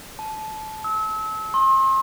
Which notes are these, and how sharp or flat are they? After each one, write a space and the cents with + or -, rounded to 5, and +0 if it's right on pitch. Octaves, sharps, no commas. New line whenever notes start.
A5 -20
E6 -35
C6 +35